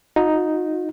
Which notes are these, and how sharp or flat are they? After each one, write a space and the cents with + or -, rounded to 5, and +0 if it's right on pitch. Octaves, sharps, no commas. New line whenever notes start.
D#4 +0 F#4 -45